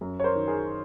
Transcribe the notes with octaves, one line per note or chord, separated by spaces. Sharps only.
F#2
C#5
A#4 C5
D#3
G#4 A#4